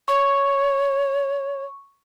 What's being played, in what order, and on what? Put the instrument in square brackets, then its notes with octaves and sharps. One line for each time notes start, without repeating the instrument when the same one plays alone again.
[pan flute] C#5 [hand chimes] C#6